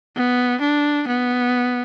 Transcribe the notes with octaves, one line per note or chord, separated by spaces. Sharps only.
B3
D4
B3